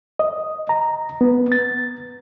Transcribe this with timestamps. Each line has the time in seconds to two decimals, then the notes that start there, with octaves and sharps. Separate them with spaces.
0.19 D#5
0.69 A#5
1.21 B3
1.52 A6